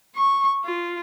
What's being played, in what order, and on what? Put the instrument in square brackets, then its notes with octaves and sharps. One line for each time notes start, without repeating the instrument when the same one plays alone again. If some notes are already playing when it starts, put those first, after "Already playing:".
[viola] C#6
F4